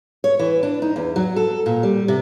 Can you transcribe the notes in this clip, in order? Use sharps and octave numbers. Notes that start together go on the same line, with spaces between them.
C#5
E3
D4
D#4
E2
F#3
A4
A#2
G3
C3